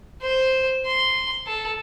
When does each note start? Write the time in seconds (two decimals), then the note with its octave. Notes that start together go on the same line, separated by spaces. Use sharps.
0.22 C5
0.86 C6
1.47 A4